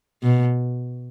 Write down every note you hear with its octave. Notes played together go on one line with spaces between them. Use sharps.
B2